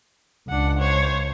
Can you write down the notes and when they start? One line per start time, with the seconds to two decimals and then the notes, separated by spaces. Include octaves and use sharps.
0.49 C#2 D4 F#5
0.79 C5 C#5